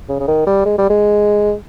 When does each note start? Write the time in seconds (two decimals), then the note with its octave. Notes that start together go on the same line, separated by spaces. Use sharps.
0.09 C#3
0.20 C#3
0.28 D#3
0.47 G3
0.66 G#3
0.78 G3
0.90 G#3